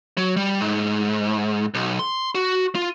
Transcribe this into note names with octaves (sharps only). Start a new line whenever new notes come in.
F#3
G3
G#2
B1
C6
F#4
F4